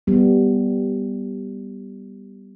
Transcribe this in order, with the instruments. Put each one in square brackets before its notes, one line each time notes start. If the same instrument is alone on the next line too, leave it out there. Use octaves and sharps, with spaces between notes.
[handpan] G3 B3